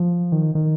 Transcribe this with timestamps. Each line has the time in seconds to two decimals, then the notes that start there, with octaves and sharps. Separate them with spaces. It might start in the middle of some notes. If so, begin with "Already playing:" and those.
Already playing: F3
0.32 D#3
0.55 D#3